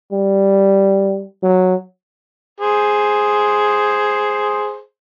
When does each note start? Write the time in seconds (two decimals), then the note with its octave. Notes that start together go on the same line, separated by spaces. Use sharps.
0.13 G3
1.43 F#3
2.60 G#4 C5